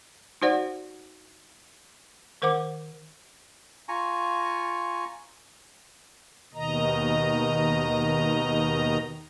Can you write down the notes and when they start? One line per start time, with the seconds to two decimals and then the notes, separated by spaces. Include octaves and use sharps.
0.42 D#4 F#4 C5 D5 F#5
2.42 D#3 A#4 C5 F#5 D6
3.88 F4 G#5 A#5 C#6
6.54 D#2 B2 D#3 D#5 A#5